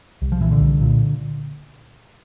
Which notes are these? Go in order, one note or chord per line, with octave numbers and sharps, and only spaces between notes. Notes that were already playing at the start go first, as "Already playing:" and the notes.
C2
F3
A#2 E3
D3
C2
A#2